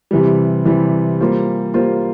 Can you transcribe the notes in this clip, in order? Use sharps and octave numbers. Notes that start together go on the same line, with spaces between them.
C3 E3 G3
C3 E3 G3
G3 A#3 F4 C5
G3 A#3 F4 C5